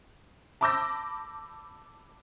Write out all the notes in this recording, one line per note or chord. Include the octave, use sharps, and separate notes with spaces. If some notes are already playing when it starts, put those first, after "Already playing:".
A5 B5 D6 E6 G6 A#6